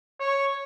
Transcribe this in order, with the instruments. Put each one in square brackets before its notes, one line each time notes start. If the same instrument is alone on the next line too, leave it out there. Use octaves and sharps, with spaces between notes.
[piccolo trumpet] C#5